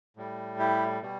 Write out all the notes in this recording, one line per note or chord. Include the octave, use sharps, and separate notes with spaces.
A2 G3
E4 G4
B2 G3